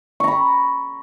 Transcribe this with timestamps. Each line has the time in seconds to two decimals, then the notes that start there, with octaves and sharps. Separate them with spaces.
0.20 C#6
0.24 A#5
0.28 B5